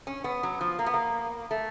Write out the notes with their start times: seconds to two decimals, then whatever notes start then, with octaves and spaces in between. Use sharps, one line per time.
0.07 C#4
0.24 B3
0.43 F#3
0.61 F3
0.79 A#3
0.86 B3
0.94 A#3
1.51 A3